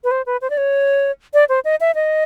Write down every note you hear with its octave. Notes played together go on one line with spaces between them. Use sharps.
B4
C5
B4
C5
D5
C#5
D5
C5
D#5
E5
D#5